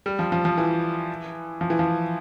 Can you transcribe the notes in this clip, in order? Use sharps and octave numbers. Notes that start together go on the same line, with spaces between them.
G3
F3
F3
F3
E3
F3
E3
F3